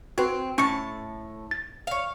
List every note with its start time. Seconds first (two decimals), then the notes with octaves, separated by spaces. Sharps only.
0.18 C4 F#4 B4
0.58 A2 C#4 A5 C#6 C#7
1.51 A6
1.87 C#5 F5